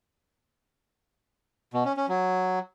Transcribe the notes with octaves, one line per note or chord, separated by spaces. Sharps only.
B2
C#4
C#4
F#3